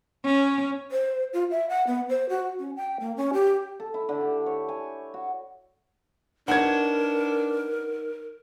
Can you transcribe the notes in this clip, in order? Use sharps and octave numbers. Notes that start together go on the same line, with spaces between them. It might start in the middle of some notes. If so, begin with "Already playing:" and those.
C#4
C5
F4
E5
F#5
B3
C5
F#4
C#4
G5
A#3
C#4
G4
A4
E4
D3
G4
C#5
G#5
F#4
D4 D#4 A#4 B4 C#5 F#5 G#6